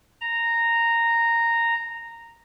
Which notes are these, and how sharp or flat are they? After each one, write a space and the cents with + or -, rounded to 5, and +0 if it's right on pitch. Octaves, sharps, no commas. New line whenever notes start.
A#5 -10